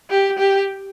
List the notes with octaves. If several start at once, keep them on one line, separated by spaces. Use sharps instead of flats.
G4
G4